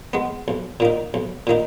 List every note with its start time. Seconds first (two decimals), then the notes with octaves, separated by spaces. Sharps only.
0.13 G#3 B3
0.48 B1
0.80 A#2 A#3 D#4
1.14 B1
1.47 A#2 A#3 D#4